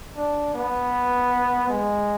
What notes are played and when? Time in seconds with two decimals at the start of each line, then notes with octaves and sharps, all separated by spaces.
0.16 D4
0.54 B3
1.69 G#3